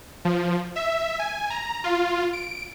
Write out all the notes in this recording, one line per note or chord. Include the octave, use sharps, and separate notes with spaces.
F3
E5
G#5
A#5
F4
D7